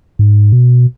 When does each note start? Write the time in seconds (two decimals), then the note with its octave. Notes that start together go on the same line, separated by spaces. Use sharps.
0.19 G#2
0.52 B2